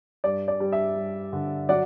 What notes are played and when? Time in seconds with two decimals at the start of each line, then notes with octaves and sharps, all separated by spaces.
0.24 G2 D5
0.48 D5
0.60 G3
0.72 E5
0.96 G3
1.33 D3
1.69 F#3 D5 F#5